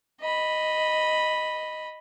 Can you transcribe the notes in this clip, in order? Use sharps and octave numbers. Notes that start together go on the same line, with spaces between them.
D#5 B5